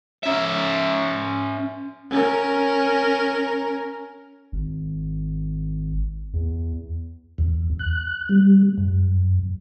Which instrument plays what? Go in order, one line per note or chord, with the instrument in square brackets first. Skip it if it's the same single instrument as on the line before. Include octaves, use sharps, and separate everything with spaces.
[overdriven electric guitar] C#4 E5
[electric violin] C#4 A#4
[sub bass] G#1
E2
[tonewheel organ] E2
F#6
G3
F#2